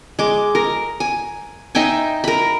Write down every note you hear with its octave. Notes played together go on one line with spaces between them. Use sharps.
G#3 D6
A#4
G#5
D#4 E5 G5 G#5
A#4 B5